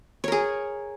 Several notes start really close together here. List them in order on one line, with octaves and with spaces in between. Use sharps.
C#5 A#4 G#4